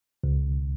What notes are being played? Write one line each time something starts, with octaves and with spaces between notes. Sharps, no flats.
C#2